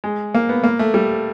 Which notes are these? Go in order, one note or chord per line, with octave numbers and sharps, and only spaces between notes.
G#3
A#3
B3
A#3
A3
G3